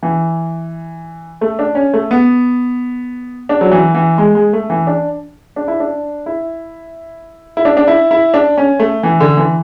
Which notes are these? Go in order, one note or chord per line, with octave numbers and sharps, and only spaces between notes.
E3
A3
D4
C#4
A3
B3
D4
F#3
E3
E3
G#3
G#3
A3
E3
D4
D4
E4
D4
E4
E4
D4
D4
E4
E4
D4
C#4
A3
E3
D3
E3